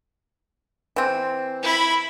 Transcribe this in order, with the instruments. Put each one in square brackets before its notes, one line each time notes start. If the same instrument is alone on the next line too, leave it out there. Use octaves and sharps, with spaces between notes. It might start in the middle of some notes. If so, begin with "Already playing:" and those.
[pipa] E3 C4
[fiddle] E4 B5